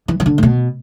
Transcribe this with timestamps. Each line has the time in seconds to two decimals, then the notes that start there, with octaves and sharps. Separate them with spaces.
0.08 E3
0.20 E3
0.26 D3
0.38 A2
0.43 B2